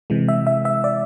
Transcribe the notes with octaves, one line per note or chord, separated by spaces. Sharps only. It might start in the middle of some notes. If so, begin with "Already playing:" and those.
C3 E3 G#3
E5
E5
E5
D5